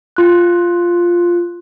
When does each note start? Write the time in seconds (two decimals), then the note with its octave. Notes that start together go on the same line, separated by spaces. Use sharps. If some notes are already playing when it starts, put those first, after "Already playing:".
0.17 F4 F#6